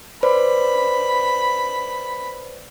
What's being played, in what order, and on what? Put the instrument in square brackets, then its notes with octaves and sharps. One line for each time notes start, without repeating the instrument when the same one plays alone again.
[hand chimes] B4 C5 D5 [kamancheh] B5